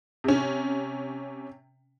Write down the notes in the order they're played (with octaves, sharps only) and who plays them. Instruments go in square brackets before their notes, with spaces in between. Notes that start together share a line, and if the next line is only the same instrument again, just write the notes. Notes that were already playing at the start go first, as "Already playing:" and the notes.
[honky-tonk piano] C3 C#4